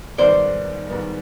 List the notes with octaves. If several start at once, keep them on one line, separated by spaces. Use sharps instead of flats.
G#2 D#3 G3 B3 C5 D5
G#2 D#3 G3 B3